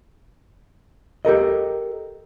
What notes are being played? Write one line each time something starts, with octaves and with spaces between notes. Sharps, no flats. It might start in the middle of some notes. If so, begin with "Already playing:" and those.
G4 A4 A#4 D#5